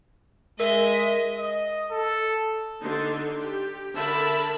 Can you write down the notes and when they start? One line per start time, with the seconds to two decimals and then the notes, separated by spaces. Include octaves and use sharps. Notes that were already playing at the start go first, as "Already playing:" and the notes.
0.60 G#3 A#4 D#5 E5
1.39 D#5
1.91 A4
2.81 D3 D#4 C6
3.40 G4
3.93 D3 A#4 E5 A5 B5